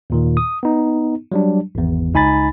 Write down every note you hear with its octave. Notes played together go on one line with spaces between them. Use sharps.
D#2 A#2 D#3
D#6
B3 D#4
F#3 G3 D4
G#1 E2
C#2 D#4 G#5 B5 A6